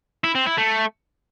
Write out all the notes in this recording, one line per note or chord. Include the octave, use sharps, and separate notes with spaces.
E4
C4
E4
A3